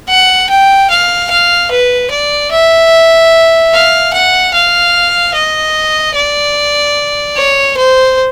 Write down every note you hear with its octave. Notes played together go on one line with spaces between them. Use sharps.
F#5
G5
F5
F5
B4
D5
E5
F5
F#5
F5
D#5
D5
C#5
C5